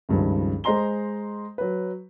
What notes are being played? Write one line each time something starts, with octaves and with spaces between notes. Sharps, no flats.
C#2 G2 D#3 F3
G#3 C5 D#5 A#5 C6 G7
F#3 B4